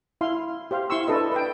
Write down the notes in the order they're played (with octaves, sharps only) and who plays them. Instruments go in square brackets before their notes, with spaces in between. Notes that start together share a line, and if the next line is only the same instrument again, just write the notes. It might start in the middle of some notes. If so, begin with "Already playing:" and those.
[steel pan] E4 F5 C6
G4 C5 F5
E4 C6 C#6 E6
D4 E4 A4 B4 D#5
B4 G5